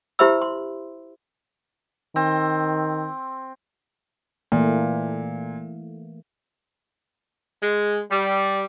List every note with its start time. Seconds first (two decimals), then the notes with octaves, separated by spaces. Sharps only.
0.19 E4 G4 C5 E5 B5 E6
0.42 C6
2.16 D#3 C4
4.52 A#2 E3 A3 A#3
7.62 G#3
8.11 G3